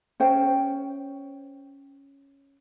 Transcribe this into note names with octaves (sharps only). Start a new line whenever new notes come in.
C#4 C5 G5